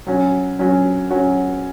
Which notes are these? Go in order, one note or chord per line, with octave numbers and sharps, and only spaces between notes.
F#3 C#4 F#4
F#3 C#4 F#4
F#3 C#4 F#4